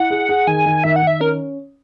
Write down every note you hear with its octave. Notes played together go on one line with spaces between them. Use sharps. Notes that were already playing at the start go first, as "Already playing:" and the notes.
Already playing: E4 F#5
G#4
G#4
D#3 G#5
D#3
D#3 E5
F#5
D#3 E5
C#4 A#4